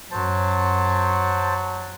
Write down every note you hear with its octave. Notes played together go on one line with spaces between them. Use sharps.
F#2 F#3 C5 A5